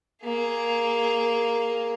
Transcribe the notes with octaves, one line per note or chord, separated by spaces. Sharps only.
A#3 G#4